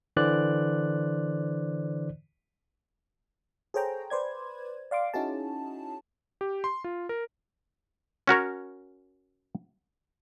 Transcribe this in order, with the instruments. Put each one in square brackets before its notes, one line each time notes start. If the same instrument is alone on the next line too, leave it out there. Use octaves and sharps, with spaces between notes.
[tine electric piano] D3 E3 C5 D5 F#6
[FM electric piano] G#4 A4 C5 C#5 G5 A#5
B4 C5 D5 G#6
D5 F5 C6 D6
C#4 D#4 E4 F#4 G#4 A5
[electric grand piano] G4
C6
F4
A#4
[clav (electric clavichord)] C#4 F#4 A#4 C#5